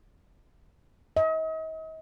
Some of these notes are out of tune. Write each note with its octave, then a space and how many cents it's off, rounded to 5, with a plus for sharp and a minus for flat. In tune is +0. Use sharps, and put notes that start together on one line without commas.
D#5 +40